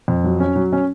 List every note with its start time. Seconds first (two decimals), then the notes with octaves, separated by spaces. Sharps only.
0.08 F2
0.24 F#3
0.40 C#4
0.56 F#3
0.73 C#4